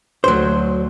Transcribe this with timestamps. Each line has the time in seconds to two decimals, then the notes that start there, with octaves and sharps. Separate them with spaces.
0.24 D2 F#3 C5